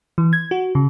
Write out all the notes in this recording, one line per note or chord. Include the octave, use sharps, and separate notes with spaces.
E3
G#6
F#4
C#3